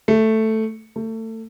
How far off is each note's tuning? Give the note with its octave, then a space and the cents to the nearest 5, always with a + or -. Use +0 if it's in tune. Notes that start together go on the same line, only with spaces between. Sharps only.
A3 +0
A3 +25